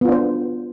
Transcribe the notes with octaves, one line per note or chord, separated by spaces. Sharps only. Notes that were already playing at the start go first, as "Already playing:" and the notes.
B3 D4 F4 C5